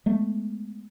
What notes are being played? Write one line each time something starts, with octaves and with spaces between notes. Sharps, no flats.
G#3 A3 B3